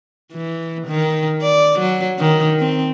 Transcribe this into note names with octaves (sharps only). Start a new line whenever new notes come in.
E3
D#3
D5
F#3
D#3
C4